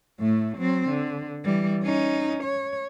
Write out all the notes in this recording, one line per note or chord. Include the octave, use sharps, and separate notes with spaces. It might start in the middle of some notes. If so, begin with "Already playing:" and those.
A2 A3
F#3 C4
D3
E3 G3
C#4 D#4
C#5